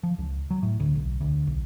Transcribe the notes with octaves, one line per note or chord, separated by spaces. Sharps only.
F3
C#2
F#3
A2
D2
B1
D2
B1